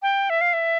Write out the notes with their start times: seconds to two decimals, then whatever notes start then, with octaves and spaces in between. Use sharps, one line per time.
0.02 G5
0.30 E5
0.41 F5
0.53 E5